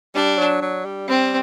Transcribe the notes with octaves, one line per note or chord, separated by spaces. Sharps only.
G3 D4
F#3
F#3
G3
G3 C4